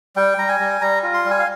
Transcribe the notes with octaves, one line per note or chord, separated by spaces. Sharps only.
G3 G5
G3 A#5
G#5
G3
G3 A#5
F4
C6
G3
G#5
F5